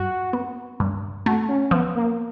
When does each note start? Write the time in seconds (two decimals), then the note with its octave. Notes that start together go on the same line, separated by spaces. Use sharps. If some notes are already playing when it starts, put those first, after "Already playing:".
Already playing: G2 F#4
0.33 B3
0.80 G2
1.26 A3 F#4
1.49 C#4
1.71 F3 B3
1.95 A#3